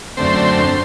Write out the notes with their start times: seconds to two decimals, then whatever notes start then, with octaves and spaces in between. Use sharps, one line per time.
0.17 F#2 D3 A3 C4 C5